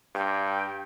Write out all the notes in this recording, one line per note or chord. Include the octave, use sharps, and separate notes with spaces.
G2 G5